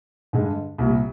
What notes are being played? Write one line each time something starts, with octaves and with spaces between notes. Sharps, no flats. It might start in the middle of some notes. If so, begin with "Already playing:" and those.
G2 D3 G#3
C2 A#2 G3